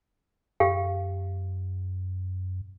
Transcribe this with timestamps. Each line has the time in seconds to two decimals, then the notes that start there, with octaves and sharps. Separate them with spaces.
0.60 F#2 G4 F5 G5